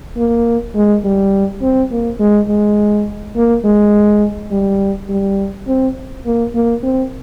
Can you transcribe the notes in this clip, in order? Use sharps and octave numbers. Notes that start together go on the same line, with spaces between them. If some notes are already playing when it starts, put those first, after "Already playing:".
A#3
G#3
G3
C4
A#3
G#3
G#3
A#3
G#3
G3
G3
C4
A#3
A#3
C4